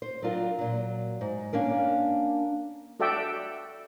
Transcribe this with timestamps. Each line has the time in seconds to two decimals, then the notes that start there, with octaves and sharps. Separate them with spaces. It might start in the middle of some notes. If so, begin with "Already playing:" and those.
0.02 C5
0.22 F#3 D4 F4 A#4
0.58 A#2 F#3
1.21 G#2
1.53 A#3 C#4 D4 A#4
3.00 F#4 A4 D5 E5 G5